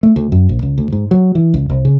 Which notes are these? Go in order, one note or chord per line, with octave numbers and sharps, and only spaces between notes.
A3
D2
F#2
A#1
C#2
D2
G#2
F#3
E3
C#2
C2
C#3